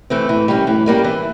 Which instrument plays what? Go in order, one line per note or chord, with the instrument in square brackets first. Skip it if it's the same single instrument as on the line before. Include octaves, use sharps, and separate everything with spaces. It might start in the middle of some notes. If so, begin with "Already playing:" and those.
[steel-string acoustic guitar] E3 A3 C4
[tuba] A2 [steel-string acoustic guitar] E3
[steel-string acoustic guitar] G3 A#3 C#4
[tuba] A2 [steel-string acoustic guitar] E3
[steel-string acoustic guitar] G3 A#3 C#4
E3